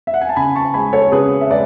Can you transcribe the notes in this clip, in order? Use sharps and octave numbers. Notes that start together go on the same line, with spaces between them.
E5
F#5
G#5
A5
C#3 G#5 B5
A5 C#6
G#3 G#5 B5
A4 C#5
C#3 G#4 B4
E5
G#3 B4 D5